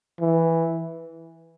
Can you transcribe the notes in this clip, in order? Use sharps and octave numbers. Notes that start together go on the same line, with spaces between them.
E3